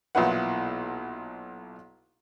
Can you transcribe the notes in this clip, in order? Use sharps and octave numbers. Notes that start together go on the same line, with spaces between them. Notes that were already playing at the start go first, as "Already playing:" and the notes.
B1 A#2 E3 E4 B4 F#5